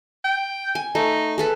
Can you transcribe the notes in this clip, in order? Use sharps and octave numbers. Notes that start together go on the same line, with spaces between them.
G5
G#5
A3 D#4
G#4 A4 B4